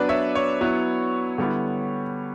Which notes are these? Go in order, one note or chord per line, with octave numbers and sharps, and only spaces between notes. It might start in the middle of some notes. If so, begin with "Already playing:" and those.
Already playing: F#3 B3 D4 B4 D5
C#5 E5
C#5
F#3 B3 E4
D3 G3 B3 E4